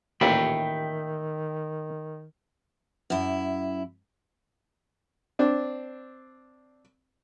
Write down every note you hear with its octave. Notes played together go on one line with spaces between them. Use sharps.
A1 D#2 A#2 D#3 E5 G5 B5
F#2 E4
C4 D4